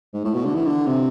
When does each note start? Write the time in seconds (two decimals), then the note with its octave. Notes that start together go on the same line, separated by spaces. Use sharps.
0.14 G#2
0.25 A2
0.34 B2
0.45 D3
0.55 E3
0.66 D3
0.87 C3